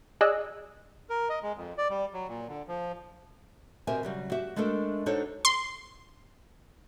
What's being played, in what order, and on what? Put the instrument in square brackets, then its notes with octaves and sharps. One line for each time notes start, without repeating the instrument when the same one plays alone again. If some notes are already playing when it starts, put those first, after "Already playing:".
[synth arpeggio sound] G#4 D5 D#5 G#5 E6 F#6
[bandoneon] A#4
D#5
G#3
F2
D5
G3
F#3
A#2
D3
F3
[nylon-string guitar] B2 C4 G4 A#4 E5 G#5
C#3 F#3 G3
F#4 G4 E5
G#3 A3 D4 A4 A#4
D4 D#4 F#4 A4 C5 C#5
[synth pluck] C6